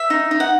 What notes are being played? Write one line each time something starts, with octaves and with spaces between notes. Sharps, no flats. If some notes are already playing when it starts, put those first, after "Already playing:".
Already playing: E5
D#4
D#4
F#5